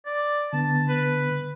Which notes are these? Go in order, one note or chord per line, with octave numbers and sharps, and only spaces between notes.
D5
D3 B3 A5
B4